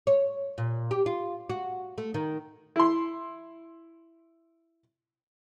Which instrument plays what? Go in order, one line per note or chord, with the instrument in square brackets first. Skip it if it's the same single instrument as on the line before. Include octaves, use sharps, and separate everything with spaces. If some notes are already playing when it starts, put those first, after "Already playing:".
[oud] C#5
A#2
G4
F4
F#4
A3
D#3
[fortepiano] E4 C6